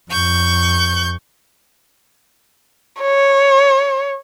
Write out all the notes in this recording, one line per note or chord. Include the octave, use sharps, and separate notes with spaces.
F2 C#6 G6
C#5